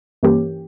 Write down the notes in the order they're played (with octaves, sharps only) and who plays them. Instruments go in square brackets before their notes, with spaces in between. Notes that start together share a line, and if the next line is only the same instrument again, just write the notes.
[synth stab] G2 E3 A#3 C#4 G4